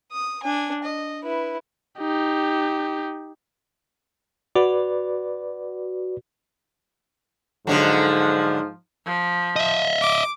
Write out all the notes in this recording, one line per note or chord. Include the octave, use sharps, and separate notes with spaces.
D#6
D4 G#5
D#5
E4 B4
D#4 G4
F#4 B4 D5
G#2 D3 F3 F#3 D#4 G4 A4
F3
D#5 E5
D6